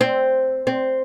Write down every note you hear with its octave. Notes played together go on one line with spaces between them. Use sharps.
C4
C4